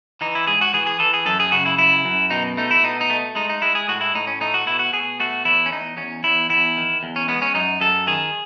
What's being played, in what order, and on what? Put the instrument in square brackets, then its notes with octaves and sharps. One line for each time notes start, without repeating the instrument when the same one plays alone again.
[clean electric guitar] E3 D#4
E4
G#2 G#4
F#4
E3 G#4
G#4
E3 A4
G#4
F#2 A4
G#4
C#3 F#4
E4
F#2 E4
F#2
B2 D#4
A3 D#4
E4
B2 D#4
D#4
A3
G#3 D#4
D#4
G#3 E4
G#4
A2 F#4
E4
A2 D#4
C#4
A3 D#4
F#4
B2 E4
F#4
B2 G#4
A3 F#4
E2 E4
C#4
E2 D#4
E2 C#4
E2 E4
E2 E4
D#3
E2
C#4
G#3 B3
C#4
F#2 D#4
F#2 A4
D#3 G#4